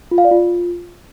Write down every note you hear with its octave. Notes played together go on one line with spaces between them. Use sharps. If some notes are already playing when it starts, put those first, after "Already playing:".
F4
F5
D5
F4